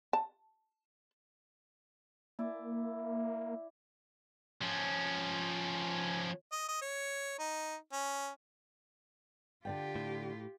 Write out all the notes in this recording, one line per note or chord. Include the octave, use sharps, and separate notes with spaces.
A5
A#3 E4 D5
F3 C#4
D#5
D#5
C#5
D#4
C#4
D3 F4 G4 D5 G5
A2